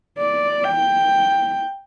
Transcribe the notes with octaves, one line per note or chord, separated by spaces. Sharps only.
D5
G5